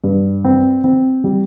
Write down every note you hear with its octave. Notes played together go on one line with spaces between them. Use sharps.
G2
C4
C4
G3